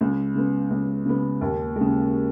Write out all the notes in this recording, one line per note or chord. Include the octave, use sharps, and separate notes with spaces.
C#2
C#3 B3
C#2
C#3 B3
D#2
C#3 G#3